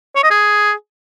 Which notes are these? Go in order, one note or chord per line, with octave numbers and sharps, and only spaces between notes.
C#5
D#5
G#4